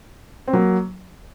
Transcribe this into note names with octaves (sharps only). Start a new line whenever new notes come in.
C4
F#3 A#3